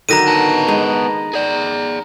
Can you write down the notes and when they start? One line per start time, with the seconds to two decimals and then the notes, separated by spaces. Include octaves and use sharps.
0.09 D3 D#3 F#3 A#5 A#6 D#7
0.28 B3 A5
0.68 G#3 D#4
1.34 G#4 D5